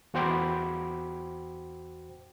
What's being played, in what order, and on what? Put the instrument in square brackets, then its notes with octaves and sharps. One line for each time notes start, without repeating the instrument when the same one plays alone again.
[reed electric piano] E2 F#4 C5 G5 B5 D6